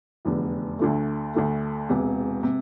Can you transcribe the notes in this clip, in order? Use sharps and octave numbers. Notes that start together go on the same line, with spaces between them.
F1 E2 D3
D2 D3 A3
D2 D3 A3
E1 E2 C3
C3